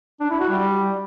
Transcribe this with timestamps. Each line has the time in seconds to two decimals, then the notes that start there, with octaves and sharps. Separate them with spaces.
0.20 D4
0.30 E4
0.40 F#4
0.49 G3